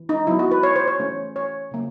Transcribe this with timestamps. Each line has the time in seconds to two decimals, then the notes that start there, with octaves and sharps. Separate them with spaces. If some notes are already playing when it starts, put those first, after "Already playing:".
Already playing: E3
0.09 D#4
0.27 F#3 B3 E4
0.39 F#4
0.51 B4
0.63 C#5
0.76 C5
0.88 C#5
1.00 E3 A3 C#4
1.36 C#5
1.71 C#3 F#3 A#3